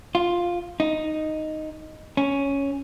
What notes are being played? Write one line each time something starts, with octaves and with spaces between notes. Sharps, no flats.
F4
D#4
C#4